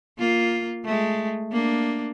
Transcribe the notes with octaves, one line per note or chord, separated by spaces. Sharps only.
A#3 F4
G#3 A3
A#3 D4